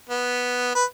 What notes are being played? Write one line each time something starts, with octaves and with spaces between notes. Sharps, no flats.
B3
B4